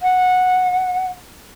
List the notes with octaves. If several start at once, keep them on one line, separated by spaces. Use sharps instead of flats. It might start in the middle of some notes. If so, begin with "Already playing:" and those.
F#5